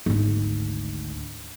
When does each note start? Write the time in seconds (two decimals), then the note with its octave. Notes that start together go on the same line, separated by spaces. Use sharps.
0.06 G#1 D2